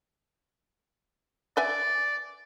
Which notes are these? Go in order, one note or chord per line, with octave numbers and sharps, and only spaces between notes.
B4 D5 E5 G#5